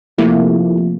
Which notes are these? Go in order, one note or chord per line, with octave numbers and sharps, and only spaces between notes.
C3 F3 A3 A#3 E4